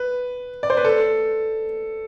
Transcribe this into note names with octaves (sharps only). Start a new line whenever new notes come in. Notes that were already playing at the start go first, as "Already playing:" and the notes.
Already playing: B4
D5
C5
B4
A4